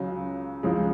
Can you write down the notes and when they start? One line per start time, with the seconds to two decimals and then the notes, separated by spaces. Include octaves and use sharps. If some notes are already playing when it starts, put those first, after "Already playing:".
Already playing: C#2 C#3 F#3
0.63 C#2 C#3 F3 G#3